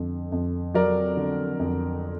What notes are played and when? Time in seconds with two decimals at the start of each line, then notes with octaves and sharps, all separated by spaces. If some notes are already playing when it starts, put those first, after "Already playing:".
Already playing: F2 D3
0.32 F2
0.74 F#3 A#4 D5
1.17 D3
1.59 F2